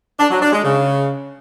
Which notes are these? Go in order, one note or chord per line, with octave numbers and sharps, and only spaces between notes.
D4
F#3
D4
G#3
C#3